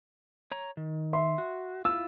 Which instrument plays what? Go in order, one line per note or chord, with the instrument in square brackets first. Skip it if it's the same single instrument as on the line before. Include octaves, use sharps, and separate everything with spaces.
[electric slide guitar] C#5 A#5
D#3
[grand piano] E5 C6
[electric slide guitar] F#4
[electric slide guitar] E4 F4 [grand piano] E6